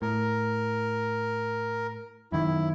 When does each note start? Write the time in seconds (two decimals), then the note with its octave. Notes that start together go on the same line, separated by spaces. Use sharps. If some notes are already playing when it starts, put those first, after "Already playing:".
0.02 A2 A#4
2.32 F#2 D#3 E4